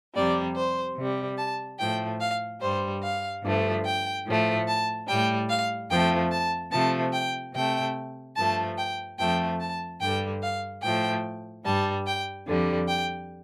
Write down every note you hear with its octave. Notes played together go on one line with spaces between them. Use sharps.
F2 C3 G3 D5
C5
C3 G3
A5
A2 F3 A3 G5
F5
G2 G3 C5
F5
G2 D3 F3 A3
G5
A2 F3 A3
A5
A2 G3 G5
F5
F2 F3 A3 G5
A5
C3 F3 A3 A5
G5
C3 A3 G5
G2 F3 A3 A5
G5
F2 F3 A3 G5
A5
G2 D3 G3 G5
F5
A2 F3 A3 G5
G2 G3 A5
G5
F2 D3 G3
G5